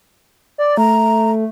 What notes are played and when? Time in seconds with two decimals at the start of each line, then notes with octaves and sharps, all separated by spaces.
0.58 D5
0.77 A3 A#5